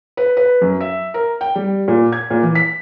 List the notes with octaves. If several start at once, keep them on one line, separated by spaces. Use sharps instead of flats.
B4
B4
F#2
E5
A#4
G5
G3
A#2
G#6
A#2
E3
B6